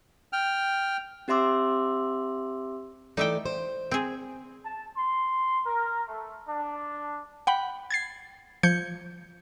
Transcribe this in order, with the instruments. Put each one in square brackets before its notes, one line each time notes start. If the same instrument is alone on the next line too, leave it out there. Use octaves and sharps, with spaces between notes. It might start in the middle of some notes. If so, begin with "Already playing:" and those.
[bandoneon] G5 F6
[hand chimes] C4 G4 E5 C6 D6 E6
[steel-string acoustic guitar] E3 A3 D5 [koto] D#4 E5 G5
[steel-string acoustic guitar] C5
[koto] C4 G#4
[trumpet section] A5
C6
A#4
A3
D4
[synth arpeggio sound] F#5 G5 B5
G#6 A6 C7
F3 G6 G#6 C#7